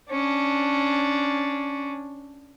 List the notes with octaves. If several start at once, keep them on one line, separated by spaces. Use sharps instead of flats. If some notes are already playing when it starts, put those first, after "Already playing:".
C#4 D4